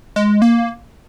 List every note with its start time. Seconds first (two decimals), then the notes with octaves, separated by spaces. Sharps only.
0.16 G#3
0.42 A#3